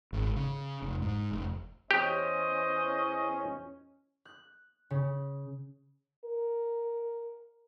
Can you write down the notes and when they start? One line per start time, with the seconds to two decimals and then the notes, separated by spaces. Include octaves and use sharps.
0.13 G#1
0.36 C#3
0.82 F1
1.02 G#2
1.32 F1
1.91 E2 C#4 G4 C5 D#5
4.25 F#6
4.90 C#3
6.25 A#4